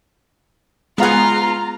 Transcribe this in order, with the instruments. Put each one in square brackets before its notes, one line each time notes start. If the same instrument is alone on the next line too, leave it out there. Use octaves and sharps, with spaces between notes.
[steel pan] G#3 F5 F#5 [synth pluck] B3 G#4 [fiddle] F4 [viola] A#5